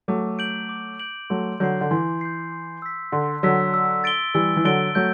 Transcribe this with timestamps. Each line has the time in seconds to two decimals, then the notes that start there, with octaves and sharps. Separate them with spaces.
0.08 F#3 A3 D6
0.39 G6 D7 F#7
0.69 D6
1.00 G6 D7 F#7
1.30 F#3 A3 C6
1.60 D3 F#3 G6 C7
1.81 D3
1.91 E3 C6
2.21 G6 C7
2.52 C6
2.82 E6 B6
3.12 D3 C6
3.43 D3 F#3 E6 B6
3.74 E6
4.04 A6 D7 G7
4.34 E3 G3 E6
4.57 E3
4.65 D3 F#3 A6 D7 G7
4.95 F#3 A3 G6